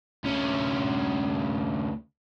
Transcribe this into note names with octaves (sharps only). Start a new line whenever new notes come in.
D2 C#4